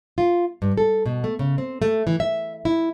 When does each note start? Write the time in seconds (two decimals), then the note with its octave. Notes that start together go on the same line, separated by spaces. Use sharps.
0.18 F4
0.62 G2
0.77 A4
1.06 B2
1.24 A3
1.39 C#3
1.58 C4
1.82 A3
2.07 E3
2.20 E5
2.65 E4